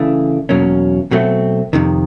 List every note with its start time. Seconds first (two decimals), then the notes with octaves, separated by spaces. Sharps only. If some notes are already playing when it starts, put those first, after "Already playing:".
Already playing: C#3 E3 A3 D4
0.49 E2 B2 F#3 A#3 C#4
1.11 B2 F#3 A3 C4
1.73 F2 C3 D#3